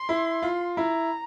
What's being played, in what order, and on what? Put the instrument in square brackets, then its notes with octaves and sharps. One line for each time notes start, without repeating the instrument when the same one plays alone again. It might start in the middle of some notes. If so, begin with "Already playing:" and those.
Already playing: [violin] C6
[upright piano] E4
F4
[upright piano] E4 [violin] A#5